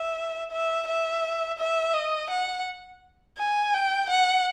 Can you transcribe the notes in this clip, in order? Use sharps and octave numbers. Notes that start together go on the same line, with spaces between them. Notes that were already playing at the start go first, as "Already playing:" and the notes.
Already playing: E5
E5
E5
E5
D#5
F#5
G#5
G5
F#5